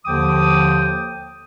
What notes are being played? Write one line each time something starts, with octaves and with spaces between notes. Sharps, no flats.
D#2 D3 F3 G5 D6 D#6